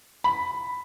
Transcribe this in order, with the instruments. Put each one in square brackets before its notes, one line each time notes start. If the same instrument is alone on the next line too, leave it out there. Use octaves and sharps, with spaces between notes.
[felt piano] B5